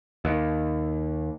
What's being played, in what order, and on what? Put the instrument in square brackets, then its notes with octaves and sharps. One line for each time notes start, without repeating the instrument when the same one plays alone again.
[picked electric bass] D#2